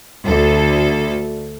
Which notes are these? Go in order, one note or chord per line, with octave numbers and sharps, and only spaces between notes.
D2 A4